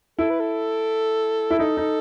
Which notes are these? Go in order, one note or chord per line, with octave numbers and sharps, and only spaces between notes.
E4 A4
B4
A4
E4
D#4 A4
D#4